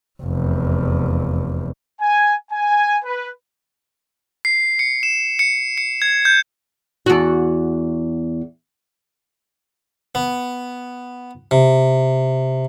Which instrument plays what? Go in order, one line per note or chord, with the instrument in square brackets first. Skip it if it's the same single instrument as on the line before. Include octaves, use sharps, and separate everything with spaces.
[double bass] F1 E2
[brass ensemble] G#5
G#5
B4
[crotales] C7
C#7
E7
C#7
C#7
G#6
G6
[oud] E2 F#4
[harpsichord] B3
C3